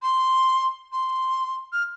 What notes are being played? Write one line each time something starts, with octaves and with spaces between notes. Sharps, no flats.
C6
C6
F6